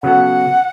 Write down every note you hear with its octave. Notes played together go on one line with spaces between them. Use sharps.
C#3 F#3 B3 A4 F#5